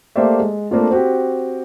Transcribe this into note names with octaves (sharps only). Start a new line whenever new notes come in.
A3 A#3 G4 C5 D5 E5
G#3
A3 A#3 C4 D4 F4 A4
C4 F#4 G4